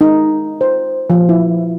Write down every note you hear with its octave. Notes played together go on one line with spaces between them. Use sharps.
D#4
C5
F3
E4